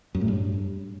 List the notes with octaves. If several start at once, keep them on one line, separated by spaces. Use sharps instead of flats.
F#2
A2
G2